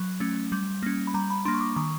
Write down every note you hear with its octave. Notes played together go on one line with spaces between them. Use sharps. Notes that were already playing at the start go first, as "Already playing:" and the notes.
Already playing: F#3
A3 C#4
G3
A#3 C#4
B5
G3 A#5
B5
A#3 D4 C6
C#6
D6
D#3 C#6